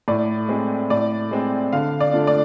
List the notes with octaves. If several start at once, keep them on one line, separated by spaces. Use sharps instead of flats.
A2 D5
G#3 C4
A2 D5
G#3 C4
D3 F5
D5
A3 D4 F4
D5